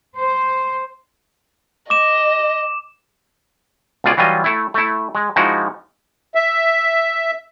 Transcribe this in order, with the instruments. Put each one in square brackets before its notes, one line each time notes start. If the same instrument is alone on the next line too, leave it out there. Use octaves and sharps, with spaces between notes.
[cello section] C5
[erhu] D#5 [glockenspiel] D6 E7
[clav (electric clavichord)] C#2 B2 F4 G#4 D5
E3 F#3 G3 F4 D#5
A3 E4
A3 E4
G#3
F3 G#3 D#4 E4 F#4
[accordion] E5